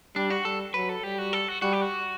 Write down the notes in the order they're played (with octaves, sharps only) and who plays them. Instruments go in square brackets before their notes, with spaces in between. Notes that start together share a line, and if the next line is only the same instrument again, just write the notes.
[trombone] G3 [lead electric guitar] D4
[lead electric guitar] F#4
[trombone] G3 [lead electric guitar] A4
[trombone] F#3 [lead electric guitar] B4
[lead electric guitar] A4
[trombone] G3 [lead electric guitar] G4
[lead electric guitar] F#4
A4
F#4
[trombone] G3 [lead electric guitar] F#4
[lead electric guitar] G4
F#4